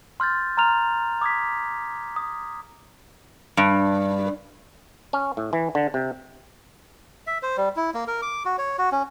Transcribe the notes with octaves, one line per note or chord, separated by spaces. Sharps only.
C6 F6 G6 A6
A#5 C6 F6 F7
D6 D#6 G#6 B6
D#6
G2
C#4
A2
E3
D3
C3
E5
C5
G3
E4
A#3
A#4
D6
F#4
C#5
F#4
C#4